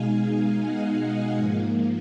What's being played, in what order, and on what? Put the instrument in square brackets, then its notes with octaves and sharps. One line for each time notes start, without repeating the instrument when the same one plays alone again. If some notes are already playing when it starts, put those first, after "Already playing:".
Already playing: [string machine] B2 G#3 D#4 F5 G#5
D#5 F#5
D#5 F#5
G#2 F3 A#3